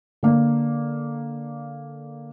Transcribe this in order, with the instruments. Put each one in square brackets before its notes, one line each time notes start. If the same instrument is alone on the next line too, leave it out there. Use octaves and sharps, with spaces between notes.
[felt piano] D3 A#3